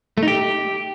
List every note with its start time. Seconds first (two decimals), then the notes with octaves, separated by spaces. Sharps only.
0.17 A3
0.23 D#4
0.28 G4